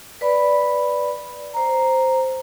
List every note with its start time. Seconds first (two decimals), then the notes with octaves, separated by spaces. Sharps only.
0.21 B4 D5 B5
1.54 C5 A#5